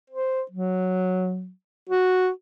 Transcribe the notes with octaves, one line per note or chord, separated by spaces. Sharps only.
C5
F#3
F#4